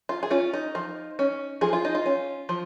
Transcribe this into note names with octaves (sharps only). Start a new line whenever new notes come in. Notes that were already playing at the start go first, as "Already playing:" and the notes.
F4
G#4
C#4 F4
D#4
F3
C#4
F3 G#4
F4
D#4
F4
C#4
F3